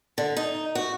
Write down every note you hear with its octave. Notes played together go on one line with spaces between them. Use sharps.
D3
D#4
F#4